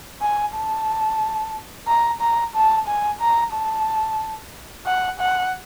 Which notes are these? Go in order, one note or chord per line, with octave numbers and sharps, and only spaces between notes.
G#5
A5
A#5
A#5
A5
G#5
A#5
A5
F#5
F#5